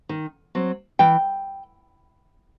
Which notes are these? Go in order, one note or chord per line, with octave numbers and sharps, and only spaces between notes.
D#3
F#3 C4
E3 G5